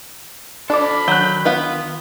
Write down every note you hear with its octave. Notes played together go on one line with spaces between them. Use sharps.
D4 A4 B4 C5 D5 B5
D#3 F#3 F#6 G6
B3 F4 B4